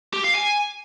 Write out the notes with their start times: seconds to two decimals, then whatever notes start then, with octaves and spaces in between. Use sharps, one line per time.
0.13 G4
0.24 F5
0.35 G#5